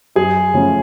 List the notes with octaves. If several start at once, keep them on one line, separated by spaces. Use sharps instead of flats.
F#2 G#4
C#3 F3 A3 C#4